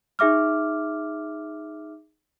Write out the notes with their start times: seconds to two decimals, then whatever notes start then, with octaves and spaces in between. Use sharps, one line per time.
0.19 D#4 G#4 E5 D6 F6